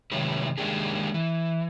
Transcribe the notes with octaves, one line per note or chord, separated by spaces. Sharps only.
A2 C3 D#3 F#3 G#3 B4
D#3 G#3 A#3 D4 G4 G#4
E3